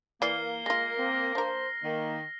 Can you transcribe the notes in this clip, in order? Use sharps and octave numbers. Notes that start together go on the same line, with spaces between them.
E3 A#3 D5 F6 C7 G7
G#3 F4 A#6
C4
D4 A#4 C5
D#3 A#3